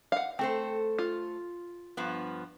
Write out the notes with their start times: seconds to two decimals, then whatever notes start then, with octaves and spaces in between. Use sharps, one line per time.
0.12 F5 F#5
0.39 A3 C4 A4 C5
0.98 F4
1.97 G2 F3 B3